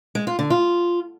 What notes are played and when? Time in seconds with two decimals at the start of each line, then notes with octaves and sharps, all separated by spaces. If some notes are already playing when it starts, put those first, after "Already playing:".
0.15 G#3
0.27 F4
0.39 D3
0.50 F4